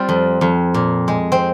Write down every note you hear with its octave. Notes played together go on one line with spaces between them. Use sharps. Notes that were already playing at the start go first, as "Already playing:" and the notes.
Already playing: G3 C4 F4
F2
F2
A#2
G#3
C4